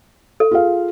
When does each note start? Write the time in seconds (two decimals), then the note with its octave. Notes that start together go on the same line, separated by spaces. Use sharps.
0.40 A4
0.51 F4 G#4 F5